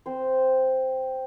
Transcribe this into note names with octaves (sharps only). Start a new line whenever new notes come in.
C4 C5